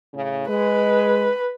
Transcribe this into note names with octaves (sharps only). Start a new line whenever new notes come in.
A2 C#3
G#3 B4